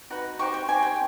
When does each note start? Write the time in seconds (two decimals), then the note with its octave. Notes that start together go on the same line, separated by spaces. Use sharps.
0.10 D#4 F#4 B4
0.39 D#4 G4 C5 C#6
0.54 G5
0.68 D#4 G4 C5 G#5
0.83 G5